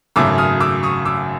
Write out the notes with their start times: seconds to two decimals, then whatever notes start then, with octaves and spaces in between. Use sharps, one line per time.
0.16 G#1 F#2 C#3 F#3 A3 D6 E6
0.38 D#6 F6
0.60 D6 E6
0.83 C#6 D#6
1.05 D6 E6